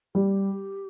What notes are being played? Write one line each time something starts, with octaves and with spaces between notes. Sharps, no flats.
G3 G4